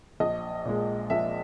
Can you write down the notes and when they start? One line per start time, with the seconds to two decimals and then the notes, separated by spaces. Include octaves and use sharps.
0.20 A#1 D#5
0.65 A#2 G#3
1.10 A#1 E5